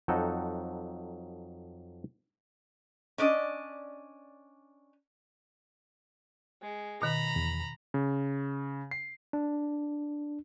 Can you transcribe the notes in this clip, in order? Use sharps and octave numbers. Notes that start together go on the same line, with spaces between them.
F2 F#3 D#4 A4 F#5 G5
C#4 D4 D5 D#5
G#3
B2 D#3 A#5 B5
E2
C#3
C7
D4